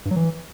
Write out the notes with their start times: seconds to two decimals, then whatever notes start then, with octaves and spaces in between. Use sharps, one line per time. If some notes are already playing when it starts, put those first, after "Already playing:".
0.05 G2
0.11 F#3
0.16 E3